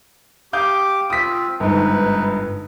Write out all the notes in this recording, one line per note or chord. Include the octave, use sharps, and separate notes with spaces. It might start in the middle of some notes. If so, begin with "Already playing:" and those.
G4 F5 D6 D#6 G6
C4 F4 D#6 B6
G1 G#2 D#4 B4